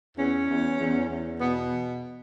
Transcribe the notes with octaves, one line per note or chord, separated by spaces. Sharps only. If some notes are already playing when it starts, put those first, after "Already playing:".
E2 C#4
E2
E2
E2
B2 B3